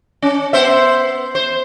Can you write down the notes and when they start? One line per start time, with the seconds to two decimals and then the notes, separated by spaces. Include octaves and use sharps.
0.22 C#4
0.53 B3 C5 E5
1.35 C5